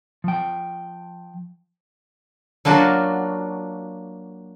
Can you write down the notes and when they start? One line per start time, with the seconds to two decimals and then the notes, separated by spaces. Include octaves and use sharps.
0.24 F3 G5
2.65 F#3 A#3 D4 F4 F#4